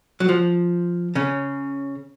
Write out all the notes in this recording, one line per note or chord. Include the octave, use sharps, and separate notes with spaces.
F#3
F3
C#3 C#4